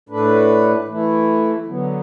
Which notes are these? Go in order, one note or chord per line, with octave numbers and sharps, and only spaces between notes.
A2 A3 D4 B4
E3 A3 E4
D3 F#3 B3